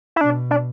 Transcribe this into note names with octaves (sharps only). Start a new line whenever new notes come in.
E4
B2 D4
D4